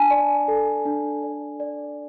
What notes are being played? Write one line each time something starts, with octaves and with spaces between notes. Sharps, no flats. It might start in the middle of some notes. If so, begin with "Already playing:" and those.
Already playing: D4 G#5 A5
D5
A4
D4
D5
D5